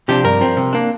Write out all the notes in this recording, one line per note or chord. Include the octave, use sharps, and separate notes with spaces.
C3 F3 D4 G4
G2 A#4
F3 C4
C3
A#3 D4